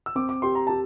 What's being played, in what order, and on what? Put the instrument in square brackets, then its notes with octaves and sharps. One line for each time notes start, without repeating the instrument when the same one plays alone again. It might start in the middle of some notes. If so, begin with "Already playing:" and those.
[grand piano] E6
[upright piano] C4 [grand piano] D6
[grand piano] D6
[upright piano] G4 [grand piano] C6
[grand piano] A#5
[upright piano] G4 [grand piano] A5